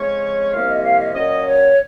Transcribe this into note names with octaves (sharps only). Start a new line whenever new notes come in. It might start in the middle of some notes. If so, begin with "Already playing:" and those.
Already playing: F2 C#3 G#3 C#4 C#5
C2 C3 F3 A#3 C#4 F5
D#5
F5
D#5
A#2 F#3 C#4 D#5
C#5